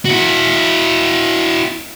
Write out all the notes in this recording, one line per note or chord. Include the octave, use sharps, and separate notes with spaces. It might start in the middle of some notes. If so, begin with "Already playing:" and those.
E4 F#4